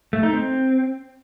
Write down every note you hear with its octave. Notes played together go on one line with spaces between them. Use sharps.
A3
D#4
C4